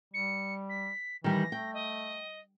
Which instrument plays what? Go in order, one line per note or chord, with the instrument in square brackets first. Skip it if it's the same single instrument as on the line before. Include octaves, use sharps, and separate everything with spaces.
[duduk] G3 [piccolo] C#7
[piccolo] B6
[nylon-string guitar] D#3 G3 [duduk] E3 [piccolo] A#6
[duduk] A3 [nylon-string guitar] G5
[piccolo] D#5